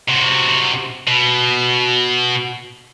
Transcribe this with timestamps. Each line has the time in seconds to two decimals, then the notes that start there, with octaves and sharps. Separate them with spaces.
0.08 C3 F#4
1.07 B2